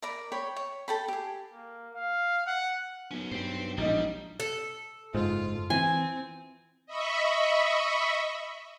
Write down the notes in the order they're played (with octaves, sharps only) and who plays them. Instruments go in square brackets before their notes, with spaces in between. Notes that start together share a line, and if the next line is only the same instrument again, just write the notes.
[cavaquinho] A#4 D5 B5
C#5 G5 B5
C#5
A4 G5 B5
G4 G#4
[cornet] A#3
F5
F#5
[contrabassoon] B1 [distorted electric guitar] F#3 C#4
[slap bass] G2 [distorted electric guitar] C5 G5
[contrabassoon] E1 [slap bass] A#1 A2 [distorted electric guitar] G3 [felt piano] D#4 D#5
[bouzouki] A4
[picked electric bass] F#1 G#2 [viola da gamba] F4
[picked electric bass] E3 [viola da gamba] C4 [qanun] G#5
[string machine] D#5 E5 B5 C#6